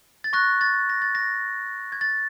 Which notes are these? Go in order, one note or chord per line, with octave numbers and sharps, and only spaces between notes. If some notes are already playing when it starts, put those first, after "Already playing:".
A6
C#6 F#6 A#6
A6
A#6
A6
A#6
G#6
A6